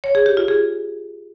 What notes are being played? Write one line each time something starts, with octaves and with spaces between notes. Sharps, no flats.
C#5
G#4
G4
F4
G#4